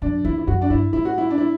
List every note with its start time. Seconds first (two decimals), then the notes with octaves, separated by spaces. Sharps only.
0.02 F#2 D4
0.25 E2 E4
0.38 E4
0.47 F#2 F#4
0.62 D4
0.70 G2 E4
0.93 A2 E4
1.05 F#4
1.18 E4
1.30 D4
1.38 E4